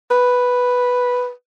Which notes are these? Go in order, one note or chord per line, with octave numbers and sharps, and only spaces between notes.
B4